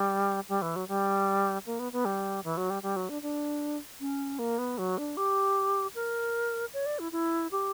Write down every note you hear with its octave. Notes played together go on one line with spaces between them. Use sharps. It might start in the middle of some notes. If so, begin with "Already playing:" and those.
Already playing: G3
G3
E3
F#3
G3
A#3
B3
B3
G3
E3
F#3
G3
G3
F#3
D4
D4
C#4
A#3
B3
F#3
D4
G4
A#4
C#5
D5
E4
E4
G4